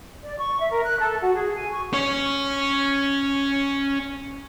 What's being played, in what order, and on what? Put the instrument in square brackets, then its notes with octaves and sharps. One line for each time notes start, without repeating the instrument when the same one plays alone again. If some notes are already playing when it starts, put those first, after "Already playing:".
[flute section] D5
C#6
E5
A#4
F#6
A4
F#4
G#4
G#5
C#6
[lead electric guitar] C#4 C#5